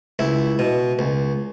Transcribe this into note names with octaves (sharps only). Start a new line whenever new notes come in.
C#2 E4
B2
C#2